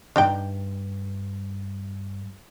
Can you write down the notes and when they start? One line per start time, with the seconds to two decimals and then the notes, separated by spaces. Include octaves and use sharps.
0.16 D2 G2 D4 D#4 G5